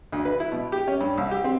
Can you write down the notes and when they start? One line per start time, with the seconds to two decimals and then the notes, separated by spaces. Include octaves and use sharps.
0.12 D2
0.25 B4
0.40 E4
0.52 B2
0.72 G4
0.88 C#4
1.01 G2
1.18 C2
1.31 G4
1.44 C4